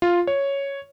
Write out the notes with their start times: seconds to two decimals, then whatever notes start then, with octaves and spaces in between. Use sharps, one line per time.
0.02 F4
0.27 C#5